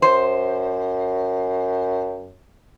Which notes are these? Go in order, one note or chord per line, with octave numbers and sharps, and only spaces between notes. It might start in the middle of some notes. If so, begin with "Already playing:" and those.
F#2 C5